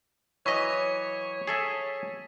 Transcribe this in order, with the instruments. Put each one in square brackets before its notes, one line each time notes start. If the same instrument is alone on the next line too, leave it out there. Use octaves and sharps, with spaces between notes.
[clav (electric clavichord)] E3 F#3 D#5 [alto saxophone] C#5 [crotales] C#6 B6
[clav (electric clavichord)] G#4 A4 E5